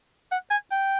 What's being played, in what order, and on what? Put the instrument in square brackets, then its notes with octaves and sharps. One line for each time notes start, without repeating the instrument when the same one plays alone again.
[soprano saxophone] F#5
G#5
G5